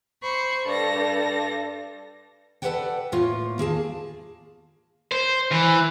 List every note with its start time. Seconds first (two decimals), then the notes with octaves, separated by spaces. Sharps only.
0.22 C5 B5 C#6
0.66 G2 A4 A#6
2.62 A4 B4 C#5 D5 F#5 G5
3.12 A2 A#3 F4 C#5
3.58 D#2 A#3 G#4 A5
5.12 C5
5.51 E3